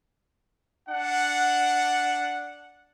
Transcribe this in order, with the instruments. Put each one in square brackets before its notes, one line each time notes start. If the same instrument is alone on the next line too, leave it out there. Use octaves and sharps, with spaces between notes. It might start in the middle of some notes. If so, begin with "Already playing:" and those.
[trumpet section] D4 F#5